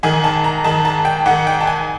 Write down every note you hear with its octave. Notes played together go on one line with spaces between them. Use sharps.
G#2 D#3 G#5
A5
A#5
G#2 D#3 A5
A5
G5
G#2 D#3 F#5
G5
A5
G#5